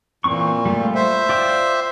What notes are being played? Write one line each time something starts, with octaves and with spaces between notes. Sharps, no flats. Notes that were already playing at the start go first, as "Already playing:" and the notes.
A#2 E3 C4 C#6
G3 A3 F4
C5 E5
F4 D5 G5